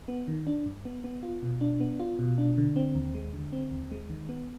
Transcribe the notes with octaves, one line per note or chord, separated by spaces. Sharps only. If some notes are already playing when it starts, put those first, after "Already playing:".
B3
D#3
D4
G2
B3
B3
F4
B2
D4
B3
F4
B2
D4
D3
C4
D#2
G#3
D3
C4
D#2
G#3
D#3
B3